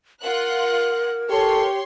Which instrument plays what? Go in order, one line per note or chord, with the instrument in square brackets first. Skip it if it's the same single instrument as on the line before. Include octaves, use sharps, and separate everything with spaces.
[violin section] F4 F#5 F#6 [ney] A#4
[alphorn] G4 [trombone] A4 [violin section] C#5 C6